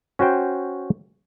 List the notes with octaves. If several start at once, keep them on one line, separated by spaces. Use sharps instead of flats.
C#4 F#4 C5 G5